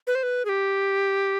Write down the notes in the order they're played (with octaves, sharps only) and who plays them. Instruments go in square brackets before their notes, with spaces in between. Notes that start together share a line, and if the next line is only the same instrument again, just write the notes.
[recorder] B4
C5
B4
G#4
G4